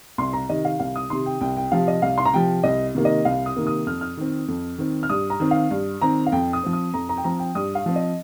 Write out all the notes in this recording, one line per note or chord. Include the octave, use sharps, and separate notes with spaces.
C2 C6
A#5
C3 D#3 D#5
F5
C2 F5
D#6
C3 D#3 C6
G5
C2 G5
G5
C3 F3 F5
D#5
C2 F5
C6
A#5
C3 F3 G5
C2 D#5
C3 D#3 A#3
D#5
C2 F5
D#6
C3 D#3 A#3
D#6
F2 F6
F6
D#3 C4
F2
D#3 C4
F6
G2 D#6
A#5
D#3 C4
F5
G2
D#3 C4 A#5
F5
F2 G5
D#6
F3 C4
D#6
F2 A#5
A#5
G5
F3 C4 A#5
G5
G2 D#6
F5
F3 C4
D#5